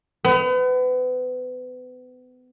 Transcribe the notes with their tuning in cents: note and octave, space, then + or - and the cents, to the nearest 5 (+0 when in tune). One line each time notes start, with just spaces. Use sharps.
B3 +35